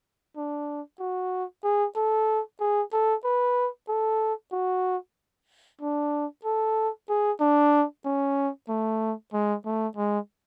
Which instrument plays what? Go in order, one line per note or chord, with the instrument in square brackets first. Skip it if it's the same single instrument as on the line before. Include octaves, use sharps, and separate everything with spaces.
[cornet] D4
F#4
G#4
A4
G#4
A4
B4
A4
F#4
D4
A4
G#4
D4
C#4
A3
G#3
A3
G#3